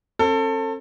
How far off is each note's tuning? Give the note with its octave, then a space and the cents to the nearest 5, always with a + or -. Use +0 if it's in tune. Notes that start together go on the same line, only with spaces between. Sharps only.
C4 +45 A4 +25